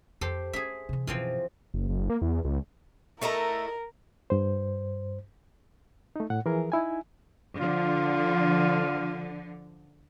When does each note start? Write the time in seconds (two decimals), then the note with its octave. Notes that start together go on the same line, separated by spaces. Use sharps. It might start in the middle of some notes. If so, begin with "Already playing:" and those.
0.21 F2 G4 A4 C5
0.53 C#4 G#4 E5
0.89 C3 E3
1.07 F#2 B2 E3 F3 C4
1.74 F#1
1.89 F#1
2.10 A#3
2.22 E2
2.45 C#2
3.22 A3 E4 A4 A#4 D#5 A5 A#5
4.30 G2 C5
6.16 A3 D#4
6.30 A2 F#5
6.46 E3 F3 G#4 A#4
6.72 D#4 E4 G#5
7.60 D3 F3 F4